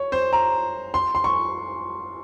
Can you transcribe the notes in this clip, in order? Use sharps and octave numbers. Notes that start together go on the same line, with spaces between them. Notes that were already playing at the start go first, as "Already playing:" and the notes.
Already playing: C#5
C5
A#5
C6
C6
C#6